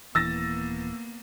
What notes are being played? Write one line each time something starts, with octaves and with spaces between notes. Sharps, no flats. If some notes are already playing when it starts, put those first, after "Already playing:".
D#1 E3 A#3 B3 E6 A6 A#6